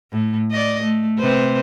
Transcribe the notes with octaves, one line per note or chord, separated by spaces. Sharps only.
A2
D5 D#5
A3
C3 B4 C5